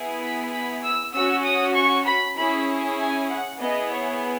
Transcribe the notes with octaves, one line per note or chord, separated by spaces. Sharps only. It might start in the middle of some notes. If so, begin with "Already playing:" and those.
Already playing: B3 E4 G#4
B5
B5
E6
C#4 F#4 E6
D#6
C#6
B5
C#4 E4 G#4 B5
G#5
F#5
B3 E4 G#4 D#5
C#5